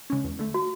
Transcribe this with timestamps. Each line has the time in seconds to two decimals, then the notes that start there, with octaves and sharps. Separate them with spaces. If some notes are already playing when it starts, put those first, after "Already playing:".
0.10 C#3 G#3 C#4
0.24 E2
0.39 D3 A3
0.54 F#4